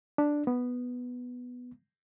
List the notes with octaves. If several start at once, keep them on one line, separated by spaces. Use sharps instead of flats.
D4
B3